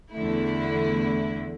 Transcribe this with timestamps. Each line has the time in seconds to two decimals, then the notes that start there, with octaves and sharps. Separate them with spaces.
0.11 E2 D3 A3 E4